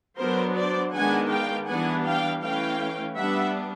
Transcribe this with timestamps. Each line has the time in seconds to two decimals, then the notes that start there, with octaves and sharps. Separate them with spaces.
0.18 F#3 B3 D4 A#4 C5
0.56 C5 D5
0.93 D#3 G#3 B3 D4 F#5 G#5
1.30 F5 G5
1.67 E3 G3 B3 D4 F#5 G#5
2.05 F5 G5
2.42 E3 A3 C#4 F5 G5
3.17 G3 B3 D4 E5 F#5